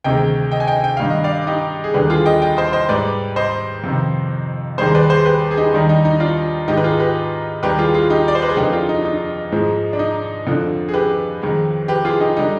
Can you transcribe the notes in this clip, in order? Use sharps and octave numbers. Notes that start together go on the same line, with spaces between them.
D2 C3 D#3 G#3 D#5 G5
D#5 G5
G#5
D#5 G5
G5
G2 D#3 G3 F5
D#5
D5 F5
D#4 G4
G#4
D#2 D3 G3 G4 B4
F4 G#4
D#5 G5
D#5 G5
C5 D#5
C5 D#5
G#2 G3 B4 D5
C5 D#5
F2 C3 D#3
D#2 D#3 G3 G#4 C5
B4 D5
G#4 C5
G4 B4
G#4
D#4 G4
D#2 D#3 G3 D#4
D#4
D#4
D4 F4
G#2 D#3 G#3 D#4 G4
B4
F4 G#4
G4 B4
D#2 D#3 G3 G4 B4
F4 G#4
F4 G#4
D#4 G4
D5
C5
B4
G#4
F2 D3 G#3 D#4 G4
D4 F4
D#4
D#4
G#2 F3 G#3
D4
D#4
F2 D3 F3
G#4
G4 B4
F2 D#3 G#3
G4 B4
F4 G#4
D#4 G4
D3 G3 D#4